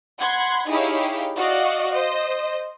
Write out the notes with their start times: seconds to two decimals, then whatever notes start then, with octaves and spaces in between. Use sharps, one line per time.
0.20 F#5 B5 C6 G#6
0.68 D#4 E4 G4 G#4 C#5 F5
1.36 F#4 D5 D#5 F5
1.91 C5 D#5